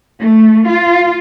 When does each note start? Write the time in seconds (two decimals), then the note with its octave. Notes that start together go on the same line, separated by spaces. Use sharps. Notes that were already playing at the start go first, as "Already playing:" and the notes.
0.21 A3
0.67 F4